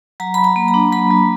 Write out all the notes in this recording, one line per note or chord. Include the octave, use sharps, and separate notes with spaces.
F#3 A#5
F#3 B5
A#5
A#3
A#5
D4
F#3 B5
F#3